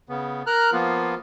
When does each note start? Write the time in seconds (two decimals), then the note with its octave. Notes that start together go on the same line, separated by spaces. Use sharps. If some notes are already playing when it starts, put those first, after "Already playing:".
0.09 C#3 B3
0.47 A#4 A#5 F6 F#6
0.72 F3 A#3 B3 F4